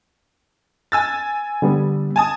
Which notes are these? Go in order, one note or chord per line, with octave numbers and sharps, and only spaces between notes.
G#5 E6 A6
D3 G3 B3
G#5 A5 D#6